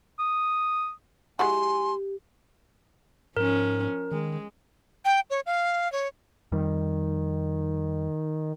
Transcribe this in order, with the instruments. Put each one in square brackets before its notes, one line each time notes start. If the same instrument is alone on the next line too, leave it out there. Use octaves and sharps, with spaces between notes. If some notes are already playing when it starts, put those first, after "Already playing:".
[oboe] D#6
[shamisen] G#3 E4 F#4 [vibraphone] G4 [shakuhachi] G#5 [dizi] C6
[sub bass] G#2 [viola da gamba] F3 C#4 [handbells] A#4
[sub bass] D#3 [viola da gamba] G#3
[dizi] G5
C#5
F5
C#5
[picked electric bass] F2 G3 [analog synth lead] D#3